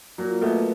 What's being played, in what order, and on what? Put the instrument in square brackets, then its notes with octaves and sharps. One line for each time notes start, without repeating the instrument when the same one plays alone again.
[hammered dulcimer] A#2 [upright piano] F#3
[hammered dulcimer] B2 [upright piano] A3